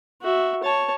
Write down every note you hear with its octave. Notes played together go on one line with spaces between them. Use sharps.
F#4 E5
C#5 A5